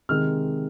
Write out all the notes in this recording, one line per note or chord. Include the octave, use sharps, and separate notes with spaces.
C3 D#3 G#3 F6